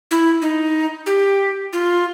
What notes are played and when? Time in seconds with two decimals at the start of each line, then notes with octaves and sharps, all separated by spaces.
0.11 E4
0.42 D#4
1.06 G4
1.73 F4